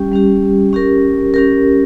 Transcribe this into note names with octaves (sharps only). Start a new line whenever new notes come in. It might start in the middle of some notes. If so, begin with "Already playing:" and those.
Already playing: G3 C#4 G4
G3 C#4 G4
C#4 G4 A#4
C#4 G4 A#4